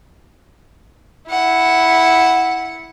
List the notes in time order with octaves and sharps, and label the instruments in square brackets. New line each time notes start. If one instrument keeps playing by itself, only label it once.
[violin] E4 F#5